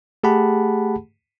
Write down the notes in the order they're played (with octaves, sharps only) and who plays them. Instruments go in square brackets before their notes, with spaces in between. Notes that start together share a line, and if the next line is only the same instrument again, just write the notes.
[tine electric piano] A3 G4 G#4 F#5 A5 B5